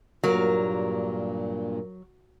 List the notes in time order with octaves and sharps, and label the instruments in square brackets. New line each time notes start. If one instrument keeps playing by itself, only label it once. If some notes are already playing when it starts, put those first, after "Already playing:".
[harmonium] G2 A#2 [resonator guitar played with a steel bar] F#3 [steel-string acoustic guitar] A#3 A#4